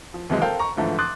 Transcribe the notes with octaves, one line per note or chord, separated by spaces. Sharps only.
F3
D#2 C3 E3 F#3 G#3
A4 A#4 C5 F5 G5
A#5 C#6
G#2 D3 E3 F3 A3
C6 D6 D#6 F#6 A6